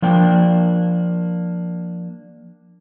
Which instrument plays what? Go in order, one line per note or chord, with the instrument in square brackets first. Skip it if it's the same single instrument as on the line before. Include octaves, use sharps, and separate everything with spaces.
[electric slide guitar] F3 A#3 D4 G5